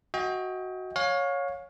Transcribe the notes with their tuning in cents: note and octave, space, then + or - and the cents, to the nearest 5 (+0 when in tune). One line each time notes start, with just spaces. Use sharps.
F#4 +0 D#5 +35 G5 +25
C#5 +0 F5 +30 G#5 -10